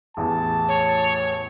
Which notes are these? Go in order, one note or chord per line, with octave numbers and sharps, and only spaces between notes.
A1 E2 A2 A5
C#5